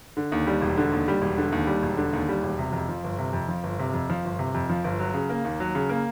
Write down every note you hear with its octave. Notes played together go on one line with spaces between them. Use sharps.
D3
D#2
G3
E1
D3
D#2
G3
E1
D3
D#2
G3
E1
D3
D#2
G3
E1
C3
F2
F3
G1
C3
F2
F3
G1
C3
F2
F3
G1
C3
F2
F3
G1
F#3
C#3
A#3
D#2
F#3
C#3
A#3